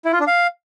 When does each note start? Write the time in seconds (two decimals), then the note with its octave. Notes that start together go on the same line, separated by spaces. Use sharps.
0.05 E4
0.12 F4
0.20 D4
0.27 F5